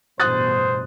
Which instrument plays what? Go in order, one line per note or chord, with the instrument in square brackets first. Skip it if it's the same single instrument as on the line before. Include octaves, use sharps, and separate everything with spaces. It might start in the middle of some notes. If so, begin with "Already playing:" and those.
[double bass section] A1 G2 B2 [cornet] C5 [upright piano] D#6 F#6 A6